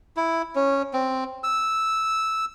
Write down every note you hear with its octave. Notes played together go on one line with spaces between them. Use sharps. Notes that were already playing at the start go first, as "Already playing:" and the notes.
E4
C#4
C4
E6